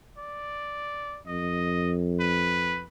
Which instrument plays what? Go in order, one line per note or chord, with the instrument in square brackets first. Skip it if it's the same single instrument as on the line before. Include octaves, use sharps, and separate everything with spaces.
[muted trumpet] D5
[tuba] F2 [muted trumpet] D#5
[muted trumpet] B4